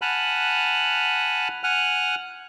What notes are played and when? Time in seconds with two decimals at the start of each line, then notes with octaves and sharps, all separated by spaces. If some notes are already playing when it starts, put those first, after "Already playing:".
0.02 F#5 G#5 A5 B5 F6 F#6
1.63 F#5 G#5 F6 F#6